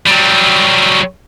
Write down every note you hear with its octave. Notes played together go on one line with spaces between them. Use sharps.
F#3 G3